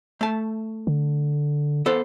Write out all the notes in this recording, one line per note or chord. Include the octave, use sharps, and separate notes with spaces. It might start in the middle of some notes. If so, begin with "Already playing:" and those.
A3 A5
D3
B3 A4 C5